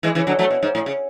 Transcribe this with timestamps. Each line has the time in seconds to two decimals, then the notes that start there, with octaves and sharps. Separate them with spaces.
0.03 E3 G#3
0.15 C#3 E3
0.27 D3 F#3
0.39 F#3 A3
0.51 B2
0.63 G#2
0.75 A2
0.86 C#3